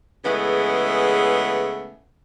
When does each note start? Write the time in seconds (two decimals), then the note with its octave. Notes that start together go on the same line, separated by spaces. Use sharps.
0.24 C#3 E3 G#3 A3 B3